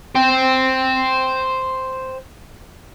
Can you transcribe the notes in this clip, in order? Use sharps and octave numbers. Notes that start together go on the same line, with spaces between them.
C5 G5